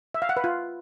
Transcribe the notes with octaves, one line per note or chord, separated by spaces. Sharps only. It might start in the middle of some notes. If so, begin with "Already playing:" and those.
E5
F5
F#5
B4
F4